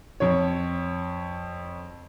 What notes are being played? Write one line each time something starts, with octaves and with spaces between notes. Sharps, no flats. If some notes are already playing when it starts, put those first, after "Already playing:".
F2 C#5